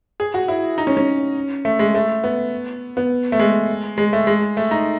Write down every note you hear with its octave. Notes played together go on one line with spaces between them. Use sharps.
G#4
F#4
E4
D#4
C#4
C#4
A3
G#3
A3
B3
B3
A3
G#3
G#3
A3
G#3
A3
D#4